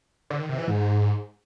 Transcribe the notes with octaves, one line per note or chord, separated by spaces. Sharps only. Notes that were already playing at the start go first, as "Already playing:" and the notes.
D3
D#3
C3
E3
G#2